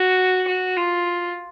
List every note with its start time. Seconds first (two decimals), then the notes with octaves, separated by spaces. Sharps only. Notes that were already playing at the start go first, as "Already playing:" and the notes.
Already playing: F#4
0.47 F#4
0.76 F4